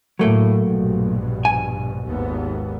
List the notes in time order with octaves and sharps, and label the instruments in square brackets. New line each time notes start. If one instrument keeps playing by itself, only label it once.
[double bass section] A2 [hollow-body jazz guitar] F#3 A3 A#3
[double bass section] A#1 G2 B2
[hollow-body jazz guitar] G#5
[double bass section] G#1 D#2 B3